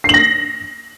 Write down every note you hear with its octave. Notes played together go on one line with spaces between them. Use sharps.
A#6 C7 F#7